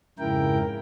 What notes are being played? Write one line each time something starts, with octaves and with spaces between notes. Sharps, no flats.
F2 G#2 C#3 E4 A#4 G5